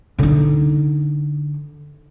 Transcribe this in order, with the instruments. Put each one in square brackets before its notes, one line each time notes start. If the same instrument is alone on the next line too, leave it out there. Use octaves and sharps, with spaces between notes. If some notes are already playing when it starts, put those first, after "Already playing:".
[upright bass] D3 D#4